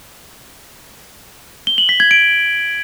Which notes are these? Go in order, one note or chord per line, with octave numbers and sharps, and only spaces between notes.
G7
F#7
B6
G#6
D7